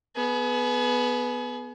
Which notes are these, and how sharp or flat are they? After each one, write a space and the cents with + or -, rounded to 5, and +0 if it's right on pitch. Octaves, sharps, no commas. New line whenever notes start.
B3 +0 G#4 +35